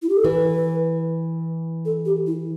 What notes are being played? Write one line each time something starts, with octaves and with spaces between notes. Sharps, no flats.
E4
G4
A4
E3 B4
A4
G4
E4